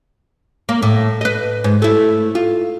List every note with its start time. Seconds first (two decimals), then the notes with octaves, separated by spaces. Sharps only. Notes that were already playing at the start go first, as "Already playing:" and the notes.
0.69 A#3
0.82 A2
1.21 B4 D#5
1.64 G#2
1.82 A3 E4
2.35 F4